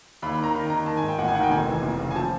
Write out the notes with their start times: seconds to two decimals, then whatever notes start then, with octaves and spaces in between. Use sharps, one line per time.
0.22 D#2 B5
0.33 D#3 B5
0.44 A#5
0.55 D#3 B5
0.70 D#3 A#5
0.86 D#3 A5
0.97 G#5
1.03 G#2
1.08 G5
1.18 A1 F#5
1.28 G#5
1.35 D#3 F#5
1.43 G5
1.51 F1 G#5
1.67 E3
1.83 F1
2.00 C#3
2.11 G#5
2.16 F3 A5